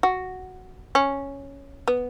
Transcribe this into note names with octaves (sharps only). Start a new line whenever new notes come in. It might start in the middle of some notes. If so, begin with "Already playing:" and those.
F#4
C#4
B3